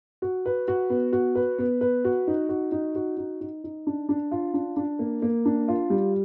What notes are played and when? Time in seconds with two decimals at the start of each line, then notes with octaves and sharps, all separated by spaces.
0.22 F#4
0.46 B4
0.68 F#4
0.90 B3
1.13 F#4
1.35 B4
1.58 B3
1.81 B4
2.05 F#4
2.27 D#4
2.49 F#4
2.72 D#4
2.95 F#4
3.17 D#4
3.41 D#4
3.64 D#4
3.87 D4
4.09 D4
4.31 F4
4.54 D4
4.77 D4
4.99 A#3
5.22 A#3
5.45 D4
5.68 F4
5.90 G3